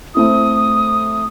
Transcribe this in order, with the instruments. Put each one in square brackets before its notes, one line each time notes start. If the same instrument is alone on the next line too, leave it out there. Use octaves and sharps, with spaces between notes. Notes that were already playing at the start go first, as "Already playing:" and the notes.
[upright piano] A3 C4 E4 [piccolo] D#6